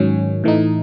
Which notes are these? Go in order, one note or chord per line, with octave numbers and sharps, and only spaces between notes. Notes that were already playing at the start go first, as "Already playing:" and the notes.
Already playing: G#2 D#3 F#3 C#4
A2 E3 A3 D#4